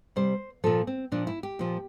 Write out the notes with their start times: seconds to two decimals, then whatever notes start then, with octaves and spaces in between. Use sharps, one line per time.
0.16 C3 G3 C5
0.64 A#2 F3 A4
0.87 C4
1.12 A#2 F3 D4
1.27 E4
1.43 G4
1.59 A#2 F3